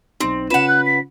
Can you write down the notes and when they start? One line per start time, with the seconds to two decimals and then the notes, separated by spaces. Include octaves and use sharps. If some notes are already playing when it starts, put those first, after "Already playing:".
0.21 B1 C4 D#4
0.50 C#3 C#4 F4 B4 F#5 E7
0.68 F#6
0.86 B6